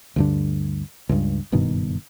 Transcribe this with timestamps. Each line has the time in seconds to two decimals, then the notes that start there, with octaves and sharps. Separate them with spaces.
0.16 D2 G2 D3
1.09 C#2 G2
1.52 F#1 G2 B2 D#3